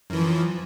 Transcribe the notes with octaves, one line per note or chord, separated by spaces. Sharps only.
F#2 E3 F3